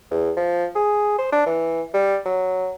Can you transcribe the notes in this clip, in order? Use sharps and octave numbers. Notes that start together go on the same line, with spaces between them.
E2
F3
G#4
C5
D4
E3
G3
F#3